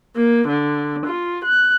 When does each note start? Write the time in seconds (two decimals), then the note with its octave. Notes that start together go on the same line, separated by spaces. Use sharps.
0.16 A#3
0.48 D3
1.06 F4
1.45 F#6